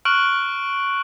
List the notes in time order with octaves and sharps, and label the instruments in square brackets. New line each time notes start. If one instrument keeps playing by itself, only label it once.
[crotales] C#6 F6 F#6 D7 F#7